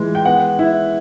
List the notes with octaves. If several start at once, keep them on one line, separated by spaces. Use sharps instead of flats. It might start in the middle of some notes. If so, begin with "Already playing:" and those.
Already playing: E3 G#3 F4
G5
B3 F#5
E4